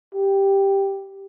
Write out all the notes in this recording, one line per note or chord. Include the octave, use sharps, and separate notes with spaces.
G4